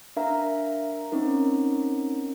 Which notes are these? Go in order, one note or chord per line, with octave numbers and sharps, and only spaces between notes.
D4 A#4 E5 F5 A#5
C4 C#4 D#4 A#4